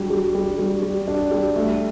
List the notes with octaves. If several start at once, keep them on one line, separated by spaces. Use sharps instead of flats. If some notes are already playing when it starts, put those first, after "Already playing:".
Already playing: G3 D4 F#4
G3
G3
G3
G3
D4
G3
A3